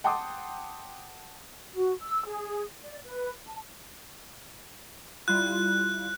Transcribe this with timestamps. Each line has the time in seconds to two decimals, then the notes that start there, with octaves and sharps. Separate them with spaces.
0.04 F#5 G5 A5 C6 D6 D#6
1.74 F#4
2.02 E6
2.26 G#4
2.82 D5
3.05 B4
3.48 A5
5.28 G3 E4 F4 F#6